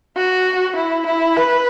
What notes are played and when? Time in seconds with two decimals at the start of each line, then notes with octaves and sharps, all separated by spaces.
0.16 F#4
0.76 E4
1.06 E4
1.36 B4